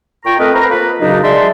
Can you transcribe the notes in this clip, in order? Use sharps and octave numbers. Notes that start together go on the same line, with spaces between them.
A#2 F4 G5 A#5 C#6
A3 C4 A#4 B4 D#5
B4 C5 F5 A#5
A#3 F4 B4
F#2 C#3 F#3 D4 D#4
G#3 D5 E5 A5 C6